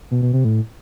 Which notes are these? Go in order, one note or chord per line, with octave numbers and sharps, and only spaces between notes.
B2
B2
C3
A2